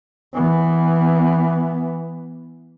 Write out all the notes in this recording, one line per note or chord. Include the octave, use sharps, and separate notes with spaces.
E3 B3